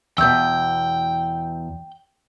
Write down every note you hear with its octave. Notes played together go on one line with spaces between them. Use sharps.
E2 B2 G5 E6 G6